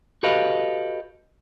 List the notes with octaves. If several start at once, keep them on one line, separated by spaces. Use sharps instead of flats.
F#4 G4 A4 B4 D#5 F5